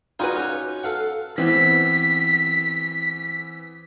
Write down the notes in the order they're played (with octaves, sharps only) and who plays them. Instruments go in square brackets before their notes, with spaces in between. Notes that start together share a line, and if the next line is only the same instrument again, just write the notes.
[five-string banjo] D#4 F#4 B4 [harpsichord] F4 G#4 D5
[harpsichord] C#4
A4 F5 F#5
[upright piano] E3 B3 C4 [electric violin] B6